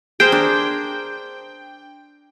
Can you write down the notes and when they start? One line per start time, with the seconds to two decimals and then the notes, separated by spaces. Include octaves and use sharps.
0.20 G#4 A#4 C5 G5
0.32 D4